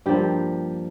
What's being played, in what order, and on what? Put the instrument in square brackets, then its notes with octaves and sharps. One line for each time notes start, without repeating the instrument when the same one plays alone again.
[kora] G2 F3 A#3 G4